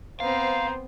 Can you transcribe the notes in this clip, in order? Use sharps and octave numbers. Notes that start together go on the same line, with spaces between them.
B3 C4 C5 F5 A#5